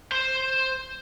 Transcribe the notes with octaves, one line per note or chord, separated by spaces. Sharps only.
C5 C6